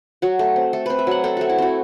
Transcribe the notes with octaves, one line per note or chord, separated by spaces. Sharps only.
F#3 F#4
A3
C4
A3 A4
C4 B4
E5
F#3 F#5
C4 A4
A3 F#4
E4
C4 F#4